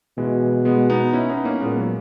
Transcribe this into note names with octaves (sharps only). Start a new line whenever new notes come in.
B2 E3 G#3
G#3 B3
B3 D#4
C#4 E4
B3 D#4
A#3 C#4
A#2 G#3 B3
F#3 A#3